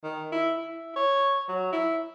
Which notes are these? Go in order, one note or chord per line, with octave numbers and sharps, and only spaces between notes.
D#3
E4
E4
C#5
F#3
E4